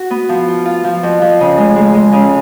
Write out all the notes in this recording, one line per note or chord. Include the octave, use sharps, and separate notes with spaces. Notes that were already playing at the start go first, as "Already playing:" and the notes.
Already playing: F#4
B3
F3
F4
F4
F3
F2
F3
C#3
G#3
G#3
G#3
C#3